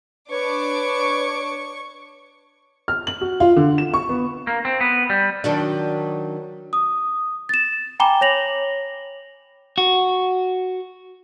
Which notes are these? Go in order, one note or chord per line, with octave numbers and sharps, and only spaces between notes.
D4 B4 C#5 C#6 D6
F6
F#7
F#4
F4
D3
E7
C#6
B3
A#3
C4
B3
G3
D#3 F#3 D4
D#6
A6 E7
G5 G#5 A#5 B5 D6 G7
C#5 A#6 F7 F#7
F#4